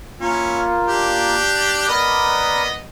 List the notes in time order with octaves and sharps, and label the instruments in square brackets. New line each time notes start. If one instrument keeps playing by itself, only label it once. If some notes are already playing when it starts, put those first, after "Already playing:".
[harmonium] A#3 F4 [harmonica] C#4 E4
[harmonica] D4 G4
[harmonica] B3 D#5 [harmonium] A#4 B4 D5